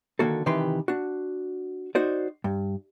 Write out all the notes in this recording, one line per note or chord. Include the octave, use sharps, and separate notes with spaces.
D3 D#3 A#3 F#4 A4
C3 D#3 E3 G4 B4 C6
D4 F#4
D#4 F#4 C5 D5
G2